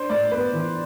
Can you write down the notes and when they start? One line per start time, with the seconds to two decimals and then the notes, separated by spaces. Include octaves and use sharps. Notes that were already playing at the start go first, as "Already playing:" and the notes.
Already playing: D4 C5
0.09 A2 D5
0.31 B3 B4
0.53 E3